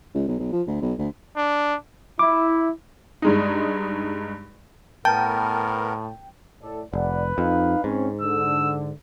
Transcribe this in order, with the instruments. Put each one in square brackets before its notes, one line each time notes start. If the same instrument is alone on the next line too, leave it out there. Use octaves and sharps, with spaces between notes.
[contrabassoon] C#2
B1
B1
F3
D2
B1
D2
[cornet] D4
[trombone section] E4 [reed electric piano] D6
[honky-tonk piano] G2 G#3 D#4
[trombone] A2 [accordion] B3 A#4 [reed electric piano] G5 [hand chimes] A5
[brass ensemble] A2 A4 D5
[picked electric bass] F1 [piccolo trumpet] B4 [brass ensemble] D5 F#5
[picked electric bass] F2 [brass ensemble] D#4 F5
[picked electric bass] G#2 [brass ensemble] C4 C#4
[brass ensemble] D3 [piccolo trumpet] E6